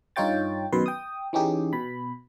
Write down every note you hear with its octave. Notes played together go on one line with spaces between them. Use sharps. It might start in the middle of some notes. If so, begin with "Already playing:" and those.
G2 D#4 F4 C#5 G5 A6
F#2 B2 D#3 B4 C6
G5 D#6
E3 C#4 D#4 G4 G#4
B2 B5